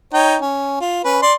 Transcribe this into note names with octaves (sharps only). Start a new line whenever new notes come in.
D#4 C#5 G5
C#4
F4
C#4 B4
D5 C6